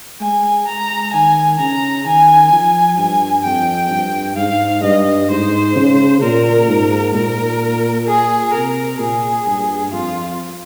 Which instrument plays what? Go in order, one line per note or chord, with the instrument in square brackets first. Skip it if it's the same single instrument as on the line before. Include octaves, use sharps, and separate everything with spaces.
[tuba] G#3 [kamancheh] G#5
[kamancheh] A#5
[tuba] D#3 [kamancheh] G#5
[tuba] C#3 [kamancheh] A#5
[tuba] D#3 [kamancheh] G#5
[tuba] F3
[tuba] G2 [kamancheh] G#5
[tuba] F2 [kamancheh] G5
[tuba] G2
[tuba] G#2 [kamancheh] F5
[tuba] G2 [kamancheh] D#5
[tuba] G#2 [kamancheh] C5
[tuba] C#3
[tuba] A#2 [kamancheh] A#4
[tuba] G#2
[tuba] A#2 [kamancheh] A#4
[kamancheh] G#4
[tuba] C3 [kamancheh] A#4
[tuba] A#2 [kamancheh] G#4
[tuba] G2
[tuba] F2 [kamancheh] F4